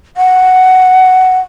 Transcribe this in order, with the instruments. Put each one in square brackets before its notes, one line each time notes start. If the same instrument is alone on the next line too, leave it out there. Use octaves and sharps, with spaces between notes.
[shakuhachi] F#5